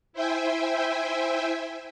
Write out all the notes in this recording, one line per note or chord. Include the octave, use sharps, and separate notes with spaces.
E4 C5 E5 G5 G#5